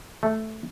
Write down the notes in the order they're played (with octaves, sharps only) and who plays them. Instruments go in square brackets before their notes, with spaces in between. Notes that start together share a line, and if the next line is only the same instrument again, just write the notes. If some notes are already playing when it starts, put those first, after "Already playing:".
[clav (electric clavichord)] A3